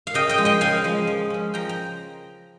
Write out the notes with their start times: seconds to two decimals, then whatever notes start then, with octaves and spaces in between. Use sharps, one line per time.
0.07 F5
0.14 C#3 D#5 G5
0.29 D#5 G5
0.38 F3 G#3
0.45 D#5 G5
0.61 C#3 F5 G#5
0.84 F3 G#3
1.07 F3
1.30 G#3 C#4
1.54 F3 G5 A#5
1.69 A#5